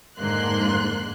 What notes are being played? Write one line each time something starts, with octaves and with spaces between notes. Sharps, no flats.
F2 G#2 D3 A#3 C6 F#6